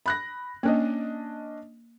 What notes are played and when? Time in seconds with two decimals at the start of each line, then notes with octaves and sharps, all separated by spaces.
0.06 B5 F#6 A#6
0.63 A#3 C#4 D4 D#5